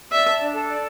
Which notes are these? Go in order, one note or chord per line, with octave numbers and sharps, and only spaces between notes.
D5 E5
A5
D4
A4
D5